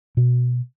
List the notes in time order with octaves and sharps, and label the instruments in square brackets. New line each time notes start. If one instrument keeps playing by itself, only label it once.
[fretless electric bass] B2